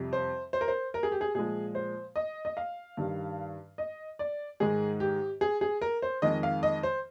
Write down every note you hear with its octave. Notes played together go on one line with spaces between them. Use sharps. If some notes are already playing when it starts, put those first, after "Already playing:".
Already playing: F2 C3 G3
C5
C5
A#4
C5
A#4
G#4
G4
G#4
A#2 F3 G#3 G#4
C5
D#5
D#5
F5
G2 D#3 G3
D#5
D5
G#2 D#3 G#3 G#4
G4
G#4
G#4
A#4
C5
F2 D#3 G#3 D#5
F5
D#5
C5